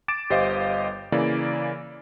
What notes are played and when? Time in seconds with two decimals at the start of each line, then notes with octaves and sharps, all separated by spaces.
0.08 D6 A6 D7 E7
0.30 G1 G4 C5 D#5 F5
1.12 C#3 E3 A#3 D5